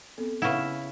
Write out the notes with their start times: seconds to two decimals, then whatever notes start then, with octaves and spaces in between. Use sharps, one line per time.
0.18 B3 C4 A4
0.42 C#3 E4 B4 E5 F#5